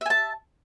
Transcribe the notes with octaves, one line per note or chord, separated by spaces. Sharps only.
E5 G#5 A5